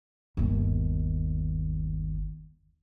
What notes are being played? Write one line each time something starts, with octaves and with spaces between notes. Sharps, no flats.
G1 D#2